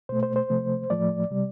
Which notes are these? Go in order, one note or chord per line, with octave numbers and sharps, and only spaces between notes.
B2 A3 C5
C5
C5
C3 F3 A3
A2 F3 A3 D5
C3 G3